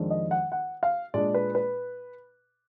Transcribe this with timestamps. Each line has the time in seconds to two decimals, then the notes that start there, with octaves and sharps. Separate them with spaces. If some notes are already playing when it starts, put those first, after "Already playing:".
Already playing: F2 D#3 G#3 D4
0.10 D#5
0.31 F#5
0.52 F#5
0.83 F5
1.14 A#2 G#3 D4 D5
1.34 B4
1.55 B4